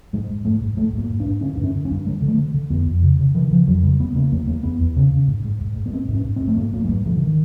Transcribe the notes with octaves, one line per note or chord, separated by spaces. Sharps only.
G#2 G#3
G#2
G#2 A3
G#2
G#2 A3
G#2
A#3
G#2
D4
G#2
D3 C#4
G2 D4
C#4
D3
C#4
G2
D3 G#3
D3
A3
D3
D3
F2 B3
F2
C#3
C#3
C#3 E3
C#3 F3
F2 F#3
C#3 G3
E2 B3
C#3 A#3
E2 A#3
E2 A#3
E2 B3
E2
C#3
C#3
G#2
G#2
G#2
G#2
B3
G#2 C4
G#2
C#4
G#2
C4
G#2
A3
G#2 A#3
G#2 A#3
G#3
G#2 G3
G#2 E3
D3
D#3